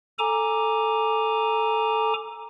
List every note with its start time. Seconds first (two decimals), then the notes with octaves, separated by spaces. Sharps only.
0.19 A4 G#5 A#5 D6